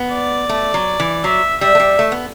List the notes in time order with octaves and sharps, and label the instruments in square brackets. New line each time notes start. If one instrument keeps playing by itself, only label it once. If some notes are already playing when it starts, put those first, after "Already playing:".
Already playing: [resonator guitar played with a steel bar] B3
[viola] D5
[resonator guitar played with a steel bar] A3
F#3
E3
[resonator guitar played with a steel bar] F#3 [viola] E5
[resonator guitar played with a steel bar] G3 [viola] E5
[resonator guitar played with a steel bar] A3
G3
A3
B3